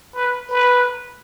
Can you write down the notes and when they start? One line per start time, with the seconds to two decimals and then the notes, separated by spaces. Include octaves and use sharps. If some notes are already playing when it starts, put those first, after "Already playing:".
0.15 B4
0.49 B4